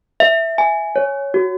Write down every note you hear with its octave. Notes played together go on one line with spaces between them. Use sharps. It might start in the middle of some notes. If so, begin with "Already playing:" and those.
E5
G#5
C#5
F#4